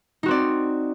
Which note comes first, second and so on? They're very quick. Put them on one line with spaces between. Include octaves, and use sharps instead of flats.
D#4 F#4 C4 D5